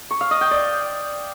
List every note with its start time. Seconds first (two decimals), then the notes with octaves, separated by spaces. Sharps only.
0.11 C#6
0.21 F5
0.31 D#5
0.41 G5
0.51 D5